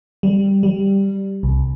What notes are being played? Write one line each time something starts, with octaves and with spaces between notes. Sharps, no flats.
G3
G3
C2